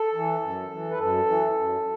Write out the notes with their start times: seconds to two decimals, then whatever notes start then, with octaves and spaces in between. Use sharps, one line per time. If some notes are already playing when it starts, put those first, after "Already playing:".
Already playing: A4
0.14 E3
0.42 F#2
0.71 E3
0.91 B4
0.98 F#2 A4
1.26 E3
1.54 F#2